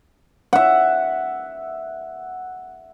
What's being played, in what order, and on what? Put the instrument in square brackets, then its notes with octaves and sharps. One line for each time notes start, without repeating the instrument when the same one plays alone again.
[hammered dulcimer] E5 F#5